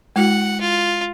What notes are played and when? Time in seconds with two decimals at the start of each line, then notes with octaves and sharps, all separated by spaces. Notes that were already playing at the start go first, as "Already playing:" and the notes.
0.16 G#3 E4 F#4 F#5
0.61 F4